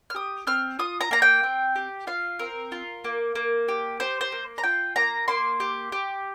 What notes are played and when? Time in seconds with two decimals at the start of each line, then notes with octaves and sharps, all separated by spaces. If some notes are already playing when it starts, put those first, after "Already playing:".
0.10 F6
0.15 G4 D#6
0.47 C4 F6
0.79 F4 D#6
1.01 A#5
1.11 A#3 A#5
1.22 G5
1.43 C4
1.76 G4
2.07 F4 F5
2.39 C4 A#4
2.72 F4
3.04 A#3
3.35 A#3
3.68 G4
4.00 G4 C5
4.21 C5
4.32 A#3
4.58 A#5
4.63 F4 G5
4.96 A#3 A#5
5.28 A#3 C6
5.60 G4
5.92 G4